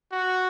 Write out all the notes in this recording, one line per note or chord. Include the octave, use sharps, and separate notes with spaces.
F#4